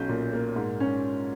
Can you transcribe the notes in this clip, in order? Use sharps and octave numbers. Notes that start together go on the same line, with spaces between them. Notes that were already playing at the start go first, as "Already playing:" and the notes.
Already playing: B1 C#4 G6
A#2
A#3
G#2
C#4